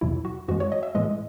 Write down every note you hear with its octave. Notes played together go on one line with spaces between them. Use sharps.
E2 B2 F#3 E4
F#4
F#2 E3 G#3 F#4
C#5
D#5
E5
A2 E3 G#3 D#5